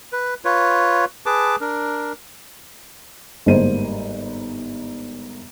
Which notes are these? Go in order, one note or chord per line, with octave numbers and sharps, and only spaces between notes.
B4
F4 B4 C#5
G#4 B4 A5 D6
D4 A#4
G1 G#2 A#3 G#4 C5 D#7